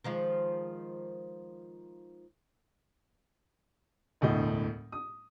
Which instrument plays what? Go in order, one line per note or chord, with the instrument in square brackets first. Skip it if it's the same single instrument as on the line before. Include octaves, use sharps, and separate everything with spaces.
[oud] D#3 F3 G#3
[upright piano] E1 D2 A2 D#5
D#6